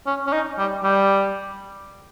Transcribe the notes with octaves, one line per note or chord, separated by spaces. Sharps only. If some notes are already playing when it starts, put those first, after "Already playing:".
C#4
C#4
D#4
G3
G3